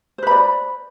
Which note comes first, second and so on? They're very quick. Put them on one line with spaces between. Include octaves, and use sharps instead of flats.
C5 B4 B5 D5